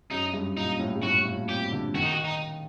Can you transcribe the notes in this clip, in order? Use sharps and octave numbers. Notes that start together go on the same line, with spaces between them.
F#2 D#4
G2
A#2 D#4
A2
G2
A2 F#4
A#2
C3 G4
D3
D#3 F#4
D#4
F#4
D#4